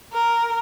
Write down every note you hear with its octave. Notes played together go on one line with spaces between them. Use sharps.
A#4